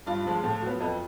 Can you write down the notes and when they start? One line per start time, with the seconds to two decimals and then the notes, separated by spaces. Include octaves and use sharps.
0.06 G2 F4
0.25 D3 F3 G#3
0.44 A2
0.62 F#3 B3
0.80 F2